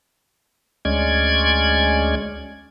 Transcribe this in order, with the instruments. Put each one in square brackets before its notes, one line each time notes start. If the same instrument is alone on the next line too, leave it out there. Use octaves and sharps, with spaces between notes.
[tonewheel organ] D2 G#3 C#4 D5 G#6